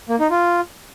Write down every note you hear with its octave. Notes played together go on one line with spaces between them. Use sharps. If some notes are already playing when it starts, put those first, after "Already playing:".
A#3
D#4
F4